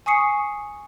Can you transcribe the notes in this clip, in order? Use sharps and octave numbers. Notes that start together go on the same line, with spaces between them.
G#5 C#6 D#6 C7 C#7